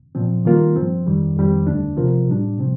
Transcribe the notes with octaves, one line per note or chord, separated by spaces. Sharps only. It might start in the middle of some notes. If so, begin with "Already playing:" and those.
A#2 F3 C4
D#3 G3 A#3 F4 A#4
G2 F3 C4
F2 D#3 G3
F2 D#3 G3 C4
D#2 D3 A3 D4
C3 F3 C4 F4 A#4
A2 G3 D4
C3 F3 C4